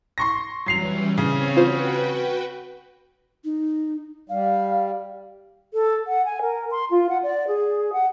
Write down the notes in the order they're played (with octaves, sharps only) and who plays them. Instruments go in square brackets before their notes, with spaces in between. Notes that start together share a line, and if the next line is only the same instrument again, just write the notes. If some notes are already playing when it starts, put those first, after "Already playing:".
[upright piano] C6 C#6 A#6
[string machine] E3 G3 C#4 [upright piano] F#3 C7 F7
[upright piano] C#3 [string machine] C4 C#5 F5
[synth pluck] F4 C5 [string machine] F#4 B4 G5
[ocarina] D#4
[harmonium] G3 [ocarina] F5
[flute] A4
F#5
G#5
A#4
C6
F4
F#5
D5
G#4
F#5